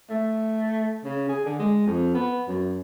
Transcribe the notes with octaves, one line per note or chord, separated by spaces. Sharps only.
A3
C#3
G#4
D3
G#3
F2
B3
F#2